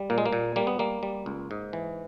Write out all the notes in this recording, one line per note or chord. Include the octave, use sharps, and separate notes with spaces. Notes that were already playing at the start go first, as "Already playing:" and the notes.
Already playing: G3
A#2 A#3
G#3
A#3
A#2
G3 A#3
B3
G3 A#3
G3
C#2
G#2
E3